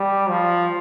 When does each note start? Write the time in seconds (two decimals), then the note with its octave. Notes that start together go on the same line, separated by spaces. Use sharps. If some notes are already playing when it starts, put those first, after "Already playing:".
Already playing: G3
0.29 F3